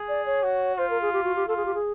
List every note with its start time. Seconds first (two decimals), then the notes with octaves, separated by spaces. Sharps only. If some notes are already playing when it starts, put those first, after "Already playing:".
Already playing: G#4
0.08 D5
0.26 C#5
0.43 F#4
0.78 F4 C5
0.90 A#4
1.01 G#4
1.13 G4
1.24 F#4
1.36 G4
1.48 F4 A4
1.57 G#4
1.65 G4
1.74 G#4